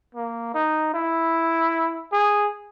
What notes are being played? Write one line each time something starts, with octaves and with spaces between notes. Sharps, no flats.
A#3
D#4
E4
G#4